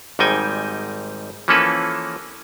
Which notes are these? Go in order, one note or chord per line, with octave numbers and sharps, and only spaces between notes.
G#1 G#2 G3 D#4 G5 G#5
E3 F3 A#3 C#4 A4 B4